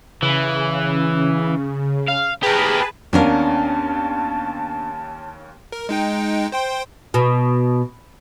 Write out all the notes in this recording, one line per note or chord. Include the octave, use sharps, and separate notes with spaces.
C#3 E3
F5
G4 G#4 A#4 B4 A5
D#2 B3 C#4 D4 A#4 F5 A5
A#4
G#3 D#4 G5
C5 G5 C6
B2